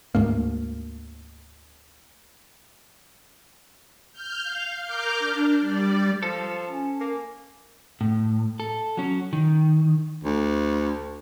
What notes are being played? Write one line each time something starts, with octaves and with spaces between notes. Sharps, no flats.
D2 G#2 A#3
F6 G6
F5
A#4 D6 F6 G6
D4
G3 D5
F3 A4
C#4
A#3
A2
A4
F#3 C#4
D#3
D2